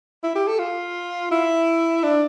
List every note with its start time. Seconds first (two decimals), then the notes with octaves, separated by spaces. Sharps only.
0.23 E4
0.35 G4
0.48 A4
0.59 F4
1.31 E4
2.04 D4